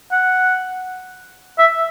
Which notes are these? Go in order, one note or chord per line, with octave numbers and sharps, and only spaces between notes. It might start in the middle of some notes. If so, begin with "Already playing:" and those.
F#5
E5